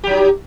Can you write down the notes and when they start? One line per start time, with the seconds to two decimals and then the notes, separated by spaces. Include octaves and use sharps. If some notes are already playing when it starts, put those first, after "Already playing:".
0.04 G4
0.07 F#3
0.10 D#4